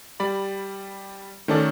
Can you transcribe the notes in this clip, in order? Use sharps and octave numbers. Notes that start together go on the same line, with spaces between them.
G3 D5 B5
D#3 A3 C#4 F#4 A4 D5